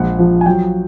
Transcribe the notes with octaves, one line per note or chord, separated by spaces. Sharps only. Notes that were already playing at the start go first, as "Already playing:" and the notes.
Already playing: A#1 G#3 F#5
F3
G#5
F#3 G5